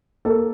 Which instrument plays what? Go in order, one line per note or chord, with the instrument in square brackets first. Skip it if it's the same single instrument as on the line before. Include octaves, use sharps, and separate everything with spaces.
[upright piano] A#3 A4